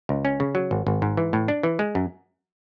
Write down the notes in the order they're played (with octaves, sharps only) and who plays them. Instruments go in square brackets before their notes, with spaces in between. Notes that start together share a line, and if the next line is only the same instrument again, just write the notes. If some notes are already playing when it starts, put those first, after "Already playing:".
[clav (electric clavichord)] C#2
C#4
C#3
F#3
G#1
G#1
G#2
E3
A2
D4
E3
G#3
F#2